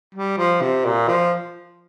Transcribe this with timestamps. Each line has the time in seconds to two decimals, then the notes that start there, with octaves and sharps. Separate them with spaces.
0.15 G3
0.38 F3
0.61 C3
0.85 A#2
1.08 F3